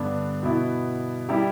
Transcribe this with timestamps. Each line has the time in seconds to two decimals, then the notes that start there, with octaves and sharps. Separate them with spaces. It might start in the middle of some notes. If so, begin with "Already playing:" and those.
Already playing: G2 D3 B3 D4
0.43 B2 B3 E4
1.29 G3 E4 G4